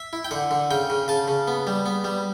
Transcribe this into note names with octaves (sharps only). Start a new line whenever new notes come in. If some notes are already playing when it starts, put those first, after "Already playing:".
Already playing: E5
E4
G5
D3 F#5
D3
C#3 G5
C#3
C#3 A5
C#3
B3
G3
B3
G3